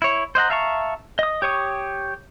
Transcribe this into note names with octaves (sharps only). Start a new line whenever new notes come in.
E4 C#5
C5 D#5 F#5 A#5
E5 F5 A5 A#5 C#6
D#5 D#6
G4 C#5 C#6 D#6